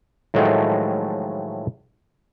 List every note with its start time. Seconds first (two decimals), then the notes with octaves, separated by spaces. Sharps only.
0.34 A2 D#3 F3 F#3 G#3 A3